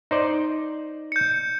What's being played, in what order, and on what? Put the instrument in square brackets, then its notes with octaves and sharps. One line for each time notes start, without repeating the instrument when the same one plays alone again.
[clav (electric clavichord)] D#4 C5 D5
[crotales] G6 C#7